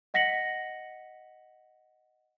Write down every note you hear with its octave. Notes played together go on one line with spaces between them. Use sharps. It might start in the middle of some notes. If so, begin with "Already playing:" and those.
D#5 F#5 A#6 B6 C#7 F#7